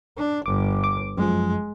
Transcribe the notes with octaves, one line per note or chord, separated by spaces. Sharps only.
D4
G1 D6
D6
F#2 F3 G#3